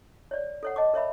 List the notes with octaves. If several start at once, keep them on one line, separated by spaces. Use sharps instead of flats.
C#5 D5
A4 C#5 F#5
D#5 A5 D6
A#4 C#5 E5 B5